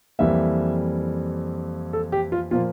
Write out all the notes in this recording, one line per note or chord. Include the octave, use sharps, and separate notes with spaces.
F2 E3 G3 A#3 E5
A4
G4
F4
A#2 F3 A#3 F4